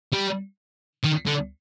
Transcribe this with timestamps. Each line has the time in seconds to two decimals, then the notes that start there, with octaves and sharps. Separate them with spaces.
0.13 G3
1.04 D#3
1.27 D3